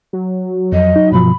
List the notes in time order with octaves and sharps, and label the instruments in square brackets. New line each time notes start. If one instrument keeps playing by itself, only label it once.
[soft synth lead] F#3
[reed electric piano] F2 [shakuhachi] D#5
[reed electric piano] D#4
[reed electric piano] G2 B2 F3 [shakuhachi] B5